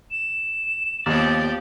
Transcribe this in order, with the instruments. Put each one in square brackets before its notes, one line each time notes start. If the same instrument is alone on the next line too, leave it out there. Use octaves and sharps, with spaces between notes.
[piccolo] E7
[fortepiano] D#2 [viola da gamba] F3 B3 G4 [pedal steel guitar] D5